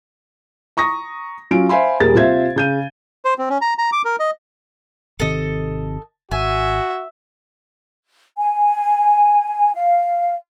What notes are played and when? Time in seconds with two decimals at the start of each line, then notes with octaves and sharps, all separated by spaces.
0.77 A#5 C#6 D#6 A#6
1.51 F#3 C#4 F4 D7
1.69 C5 E5 F5 G#5 B5 C6
2.00 D#1 G3 G#4 A#4 A6
2.15 C3 F4 C5 E5 G#6
2.56 C#3 G6 D#7
3.25 C5
3.38 C4
3.49 C#4
3.61 A#5
3.78 A#5
3.92 D6
4.05 A#4
4.20 D#5
5.20 G#1 C3 D#3 A4 D#5
6.31 G#1 F#4 E5 G#5
8.38 G#5
9.75 F5